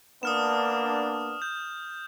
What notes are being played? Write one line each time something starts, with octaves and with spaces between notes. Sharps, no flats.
A#3 B3 D4 D#6 F6 E7
G6